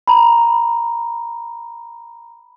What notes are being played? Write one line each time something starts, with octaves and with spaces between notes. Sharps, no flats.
A#5 B5